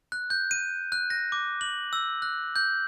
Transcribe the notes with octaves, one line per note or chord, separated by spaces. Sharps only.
F#6
G6
D#7
F#6
A#6
D6
F#7
E6
F#6
G6